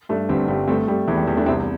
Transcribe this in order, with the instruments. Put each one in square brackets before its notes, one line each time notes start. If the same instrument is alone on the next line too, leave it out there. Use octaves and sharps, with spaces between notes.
[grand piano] G2 [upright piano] A3 D4
[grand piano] G1 [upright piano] G3 C4
[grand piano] G2 [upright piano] G3 C4
[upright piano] G3 C4 [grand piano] A3
[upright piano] G3 [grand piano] A3
[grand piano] E2 [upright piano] E3
[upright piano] G3
[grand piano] E2 [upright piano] G3
[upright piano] A3 D4
[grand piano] C2 [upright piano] C4 E4